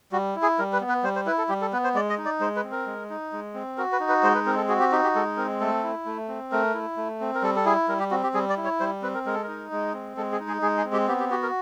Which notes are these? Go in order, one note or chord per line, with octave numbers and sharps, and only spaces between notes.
G3 F#4
E4
G#4
G3 A#4
B4
B3
B4
G3 C5
C5
E4 B4
A4
G3 G4
A4
B3 B4
C5
G#3 D5
D#5
D#4
D5
G#3 C5
B4
C4
A#4
G#3
D#4
G#3
C4
F#4 A#4
B4
D#4
B4
G#3 C5
B4
C4 A#4
A4
F#4 G#4
G4
D#4 G4
G4
G#3 A4
C4 A#4
A3 A4
E4
A3
C4
A3 A#4
E4
A3
C4
A#4
G3 A4
A4
E4 G#4
G3 A#4
G4
C4 F#4
G4
G3 G#4
D5
E4
C#5
G3 C5
C4 B4
A#4
G#3 A#4
A4
D#4 A#4
G#3
C4
G#3 A4
G#4
D#4
G#4
G#3 G#4
G#4
C4
G4
B3 G4
G4
F#4 G4
A#4